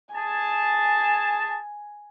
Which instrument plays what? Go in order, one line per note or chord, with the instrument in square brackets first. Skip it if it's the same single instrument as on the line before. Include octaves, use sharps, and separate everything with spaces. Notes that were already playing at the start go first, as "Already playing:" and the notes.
[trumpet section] G#4 A5 [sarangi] G#5